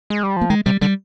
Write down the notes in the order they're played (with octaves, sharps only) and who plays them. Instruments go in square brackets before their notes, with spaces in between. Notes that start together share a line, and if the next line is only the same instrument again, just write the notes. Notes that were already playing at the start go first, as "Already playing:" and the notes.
[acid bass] G#3
G3
[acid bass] F3 [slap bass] A#3
[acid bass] D#3 [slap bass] G#3
[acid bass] C3 [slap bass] G3
[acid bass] D3 [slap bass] G3